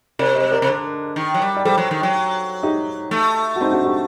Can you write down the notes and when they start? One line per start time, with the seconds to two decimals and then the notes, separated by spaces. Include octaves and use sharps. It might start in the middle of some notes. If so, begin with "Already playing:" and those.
0.19 C3 A#4 D5
0.35 C5 D#5
0.52 A#4 D5
0.62 C3
0.68 D3
1.16 D#3
1.34 F#3
1.42 G3
1.57 D5
1.65 G3 A4 C5
1.78 F#3
1.91 D#3
2.03 F#3
2.63 D#4 G4
3.11 A3
3.56 F#4
3.61 C4 D#4
3.73 D4 F#4
3.85 D#4 G4